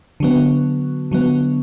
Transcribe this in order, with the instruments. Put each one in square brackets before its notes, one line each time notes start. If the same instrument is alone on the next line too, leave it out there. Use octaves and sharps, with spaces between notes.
[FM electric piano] D3 F#3 B3
D3 F#3 B3